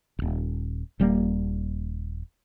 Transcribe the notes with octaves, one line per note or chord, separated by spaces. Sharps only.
D#1 G#1
D#1 G3 A3 A#3